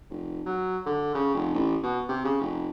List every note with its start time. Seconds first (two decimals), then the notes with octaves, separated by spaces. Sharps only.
0.10 F1
0.46 F#3
0.86 D3
1.15 C#3
1.35 F1
1.54 A1
1.83 B2
2.09 C3
2.25 C#3
2.41 F1